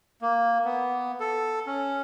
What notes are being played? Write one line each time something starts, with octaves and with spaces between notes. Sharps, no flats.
A#3
B3
A4
C#4